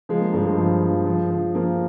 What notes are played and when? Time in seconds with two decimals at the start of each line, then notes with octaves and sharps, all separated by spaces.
0.09 F3 G#3
0.21 A#3
0.33 G2 G#3
0.46 G#3
0.57 F3
0.82 F3
1.06 F3
1.30 F3
1.55 F3 A#3